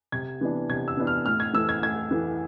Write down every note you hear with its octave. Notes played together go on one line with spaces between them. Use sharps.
C3 G#6
E3 B3 D4
C3 G#6
E6
E3 B3 D4
F6
A2 F6
G#6
E3 A3 E6
G#6
A2 G#6
E3 A3